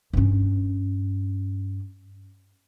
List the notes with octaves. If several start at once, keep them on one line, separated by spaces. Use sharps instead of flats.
G2 C#4